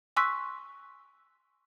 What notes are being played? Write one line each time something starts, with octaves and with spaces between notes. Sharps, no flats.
G#5 C6 C#6 E6 F#6 B6